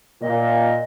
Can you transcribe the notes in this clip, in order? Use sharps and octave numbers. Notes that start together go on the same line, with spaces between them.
A#2 D#5